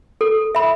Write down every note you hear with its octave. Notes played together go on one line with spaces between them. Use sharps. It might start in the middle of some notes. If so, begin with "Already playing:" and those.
A4
E5 B5